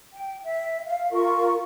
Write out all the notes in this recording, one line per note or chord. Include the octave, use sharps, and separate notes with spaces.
G5
E5
F5
F4 A#4 C#6